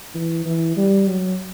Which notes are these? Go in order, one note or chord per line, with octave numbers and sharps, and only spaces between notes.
E3
E3
G3
F#3